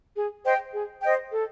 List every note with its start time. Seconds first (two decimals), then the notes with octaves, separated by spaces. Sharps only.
0.15 G#4
0.44 C5 D#5 G5
0.73 G#4
1.02 C5 D#5 G5
1.31 A4